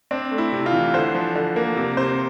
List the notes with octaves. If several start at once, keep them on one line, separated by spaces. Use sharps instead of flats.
C4 D4
A3
E4
C3
F4
E3
D3 C5
F3
D3
A#3
C3
C3 C5